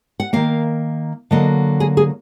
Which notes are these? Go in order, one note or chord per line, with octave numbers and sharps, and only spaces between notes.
F#5
D#3 A#3 F5
D3 F#3 A#3 D#5
G#4
G#4